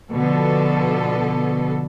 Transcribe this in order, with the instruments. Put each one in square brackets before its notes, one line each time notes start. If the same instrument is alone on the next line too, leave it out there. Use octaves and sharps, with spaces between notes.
[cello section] B2 D3 F3 B3 A4